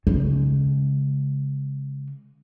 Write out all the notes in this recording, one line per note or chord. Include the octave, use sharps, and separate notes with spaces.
C#3 G#3